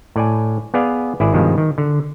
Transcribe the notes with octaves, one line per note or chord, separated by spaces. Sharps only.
A2 D5 G#5
B3 G#4 D5 F5 G#5
G#1 E4 G#4 D5
G2 B2 D#3 F3 G#3
D#3
D3